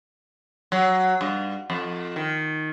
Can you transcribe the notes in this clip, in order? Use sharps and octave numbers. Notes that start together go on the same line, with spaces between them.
F#3
G2
F2
D#3